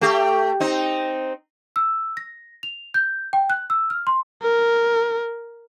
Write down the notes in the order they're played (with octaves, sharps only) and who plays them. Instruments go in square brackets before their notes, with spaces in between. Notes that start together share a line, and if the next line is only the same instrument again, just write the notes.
[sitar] A3 G4
C4 D#4
[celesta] E6
A#6
F7
G6
G5
F#6
E6
F6
C6
[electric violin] A#4